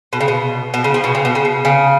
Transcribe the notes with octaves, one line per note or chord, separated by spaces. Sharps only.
B2
C#3
B2
B2
C#3
F3
B2
C#3
B2
C#3
B2
C#3